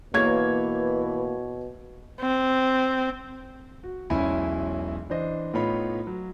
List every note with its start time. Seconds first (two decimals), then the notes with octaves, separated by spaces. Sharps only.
0.14 B2 E3 A#3 C#5 G#6
2.21 C4
3.83 F#4
4.10 E1 B1 C#4 E4 G#5 B5
5.10 E3 D4 C5 D#5
5.54 A2 B3 D#4 F4 C#5 B5
6.07 F#3